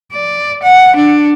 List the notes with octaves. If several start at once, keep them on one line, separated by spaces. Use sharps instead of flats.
D5
F#5
D4